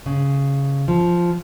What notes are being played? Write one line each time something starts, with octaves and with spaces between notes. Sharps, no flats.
C#3
F3